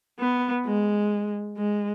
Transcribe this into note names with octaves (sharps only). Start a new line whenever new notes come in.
B3
G#3
G#3